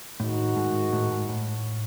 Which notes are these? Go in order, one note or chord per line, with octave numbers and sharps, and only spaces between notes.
A2 D#3 G#3 D#4 F#4
G#2
A2
G#2
A2